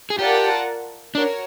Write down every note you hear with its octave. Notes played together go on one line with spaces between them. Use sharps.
G#4
F4 G4 A#4 D5 F#5 A5
D4 F#4 A#4 C#5